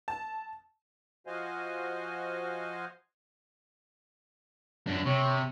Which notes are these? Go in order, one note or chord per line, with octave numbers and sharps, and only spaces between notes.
A5
F3 F#4 C5 D#5 F5 G#5
F#2 D4
C3 C#5